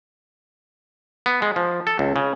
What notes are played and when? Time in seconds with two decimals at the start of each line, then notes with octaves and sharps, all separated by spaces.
1.26 B3
1.42 G#3
1.56 F3
1.87 A4
1.99 C#2
2.16 C#3